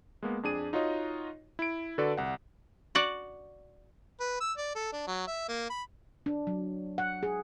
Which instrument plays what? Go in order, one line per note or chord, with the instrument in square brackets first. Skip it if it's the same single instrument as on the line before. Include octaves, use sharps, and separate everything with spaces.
[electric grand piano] G#3 A#3 B3
F2 D4 G#4 D#7
D#4 F4 F#4 C#5 D#5
E4 D7
D3 F#4 A4 B4 D5
C2 F#5
[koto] F#4 D5 F#5
[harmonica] B4
E6
D5
A4
D4
F#3
E5
A#3
B5
[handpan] D4
F#3
F#5
G#4